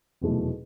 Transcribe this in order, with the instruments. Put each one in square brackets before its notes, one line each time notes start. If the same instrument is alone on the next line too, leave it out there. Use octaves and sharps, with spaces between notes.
[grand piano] F1 E2 B2 F#3 A3